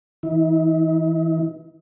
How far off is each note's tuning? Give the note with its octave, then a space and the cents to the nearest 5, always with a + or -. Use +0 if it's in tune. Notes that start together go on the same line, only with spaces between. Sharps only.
E3 -15 D#4 +45